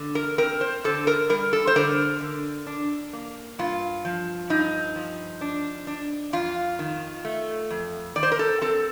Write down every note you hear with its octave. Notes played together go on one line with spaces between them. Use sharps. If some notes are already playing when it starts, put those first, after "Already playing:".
Already playing: D3
A#4
C4 A#4
C5
D3 A4
A#4
G3 A#4
A4
C5
D3 A#4
D3
D4
A#3
G2 F4
F3
G2 D#4
F3
D4
D4
F2 F4
D#3
A3
F2
D#3 D5
C5
A#4
A4
C4 A4